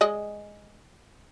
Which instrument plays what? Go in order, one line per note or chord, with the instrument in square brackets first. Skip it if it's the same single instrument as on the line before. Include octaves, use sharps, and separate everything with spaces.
[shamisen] G#3 D5 D#5